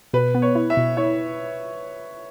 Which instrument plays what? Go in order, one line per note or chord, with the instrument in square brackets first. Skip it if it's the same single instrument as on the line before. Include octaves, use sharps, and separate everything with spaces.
[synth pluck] B2 [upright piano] B4
[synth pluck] B3
[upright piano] C#5
[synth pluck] E4
[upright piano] E5
[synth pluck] B2
[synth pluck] E4 [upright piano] C#5